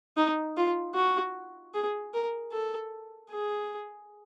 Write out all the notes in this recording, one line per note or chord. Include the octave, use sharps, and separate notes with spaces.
D#4
F4
F#4
G#4
A#4
A4
G#4